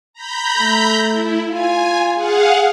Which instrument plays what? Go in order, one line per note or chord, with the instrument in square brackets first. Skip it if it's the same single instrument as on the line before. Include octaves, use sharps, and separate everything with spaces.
[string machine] A#5 B5 G6
[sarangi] A3
[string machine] E4
[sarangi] F4 [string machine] G#5
[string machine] G#4 F5 F#5